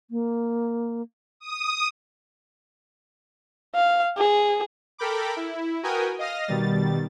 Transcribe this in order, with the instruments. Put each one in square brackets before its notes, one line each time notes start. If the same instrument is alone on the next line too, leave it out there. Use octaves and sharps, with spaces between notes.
[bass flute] A#3
[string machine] D#6
[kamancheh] F5
G#4
[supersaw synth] A4 A#4 G5 B5 D6
E4
F#4 A#4 B4 G5 G#5 D#6
D#5 F5 D#6 F6 A#6
B2 D#3 G3 A6